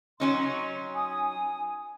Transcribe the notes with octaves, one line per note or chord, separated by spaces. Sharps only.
F#3 C#4 D#4 C6
G#5 D#6